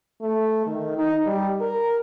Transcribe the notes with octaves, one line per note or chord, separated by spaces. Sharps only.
A3
D#3
D#4
G3
A#4